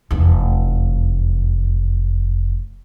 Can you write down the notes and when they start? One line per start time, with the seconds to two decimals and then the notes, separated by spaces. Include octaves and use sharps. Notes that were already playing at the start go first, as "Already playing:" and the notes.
0.11 F1 E2